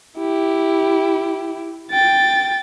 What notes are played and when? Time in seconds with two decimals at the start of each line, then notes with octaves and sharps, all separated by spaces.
0.18 E4 G4
1.91 G5 A6